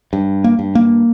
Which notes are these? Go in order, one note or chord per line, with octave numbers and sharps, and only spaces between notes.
G2
A#3
G2
A#3